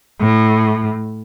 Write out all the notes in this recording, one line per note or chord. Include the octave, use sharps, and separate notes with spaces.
A2